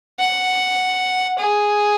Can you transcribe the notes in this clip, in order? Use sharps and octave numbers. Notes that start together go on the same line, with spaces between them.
F#5
G#4